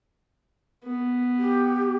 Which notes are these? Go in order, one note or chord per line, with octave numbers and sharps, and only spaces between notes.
B3
G4